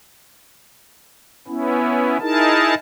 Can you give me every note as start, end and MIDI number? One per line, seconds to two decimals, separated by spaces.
1.48 2.18 59
1.48 2.18 61
1.48 2.18 64
2.20 2.74 63
2.20 2.74 64
2.20 2.74 68
2.20 2.74 70
2.20 2.74 81